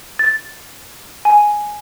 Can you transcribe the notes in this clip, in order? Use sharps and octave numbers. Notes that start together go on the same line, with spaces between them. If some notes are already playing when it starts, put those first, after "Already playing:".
A6
G#5